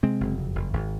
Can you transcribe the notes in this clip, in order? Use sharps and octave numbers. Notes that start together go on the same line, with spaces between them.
C3 G#3 C4
F#1
F2
F#1
G#1